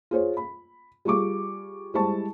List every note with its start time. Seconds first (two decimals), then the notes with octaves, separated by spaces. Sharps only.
0.11 F4 G#4 C5 C#5
0.37 B5
1.05 G3 F4 G#4 C#6 D6
1.94 G3 G#3 E4 C5 A5 C#6